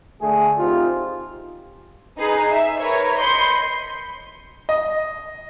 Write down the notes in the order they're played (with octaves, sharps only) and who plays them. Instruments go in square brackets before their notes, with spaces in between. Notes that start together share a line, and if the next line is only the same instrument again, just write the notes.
[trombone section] D3 A3 G#4
C4 D#4 F4 G4
[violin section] D#4 G#4 B4 C7
E5
A#4 B4 C#5
D#5 B5 C6 G6 C7 C#7
[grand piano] D#5